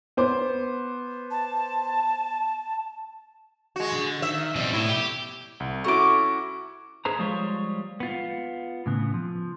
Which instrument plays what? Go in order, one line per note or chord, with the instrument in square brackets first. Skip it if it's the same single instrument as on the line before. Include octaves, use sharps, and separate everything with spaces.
[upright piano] B3 C5 D6
[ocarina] A5
[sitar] G#3 F#4
[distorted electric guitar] D3
[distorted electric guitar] D#3 [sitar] E5
[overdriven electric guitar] F2 G3 [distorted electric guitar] B2
[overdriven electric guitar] A2 [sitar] E4
[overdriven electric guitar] G4
[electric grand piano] C2
[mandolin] C#4 D6 [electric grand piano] E4 F#4 A4
[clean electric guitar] G#4 B4 C5 A#5
F3 G3 G#3 F4 C5 C#5
B3 F4
A2 C#3 B3
F3